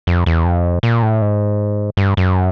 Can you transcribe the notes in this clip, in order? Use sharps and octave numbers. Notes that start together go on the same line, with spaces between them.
F2
E2
F2
A#2
A2
G#2
G2
F#2